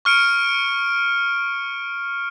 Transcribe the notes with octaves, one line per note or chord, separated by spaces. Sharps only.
C#6 F6 C#7 D7